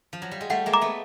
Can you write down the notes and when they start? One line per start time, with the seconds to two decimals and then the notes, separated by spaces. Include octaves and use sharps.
0.13 F3
0.22 F#3
0.31 G3
0.41 G#3
0.50 G3 A3 F#5
0.66 G#3 A#3
0.74 A#5 D6
0.81 A3 B3